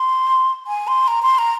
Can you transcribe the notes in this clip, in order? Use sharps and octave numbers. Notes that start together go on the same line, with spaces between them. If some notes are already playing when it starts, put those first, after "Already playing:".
Already playing: C6
G#5
C6
A#5
C6
A#5